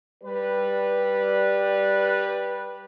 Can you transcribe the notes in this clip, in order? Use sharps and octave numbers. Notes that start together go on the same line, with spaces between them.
G3 B4